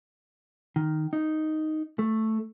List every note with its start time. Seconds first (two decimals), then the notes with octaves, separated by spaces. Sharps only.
0.76 D#3
1.13 D#4
1.99 A3